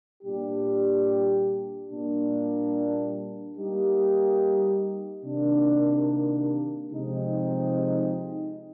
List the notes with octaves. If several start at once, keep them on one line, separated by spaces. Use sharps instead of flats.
A#2 G3 D4 G4
A#2 G3 A#3 D4
G3 A#3 D#4 G4
C3 D#3 A#3 D4
C3 F3 G#3 C4 D#4